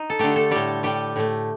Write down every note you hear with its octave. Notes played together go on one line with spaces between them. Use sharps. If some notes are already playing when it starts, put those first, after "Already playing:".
Already playing: D#4
A4
D3 A3 G4
A4
A2 G3 G4
A2 G3 G4
A2 A3